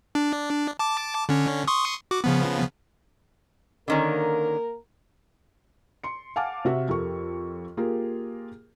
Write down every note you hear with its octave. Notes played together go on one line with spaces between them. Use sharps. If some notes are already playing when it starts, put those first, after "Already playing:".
D4
A5 D6
D3 C#4
C6 C#6 D#6
F#4 D6
C#3 F3 B3
D3 D#3 A#3 C#4 A#4
C6 C#7
F5 F#5 G#5 A5 D6 F6
C3 F#4 E5
F2 G4 A4 A#4 C#6
A#3 F4 G4 G#4 A#4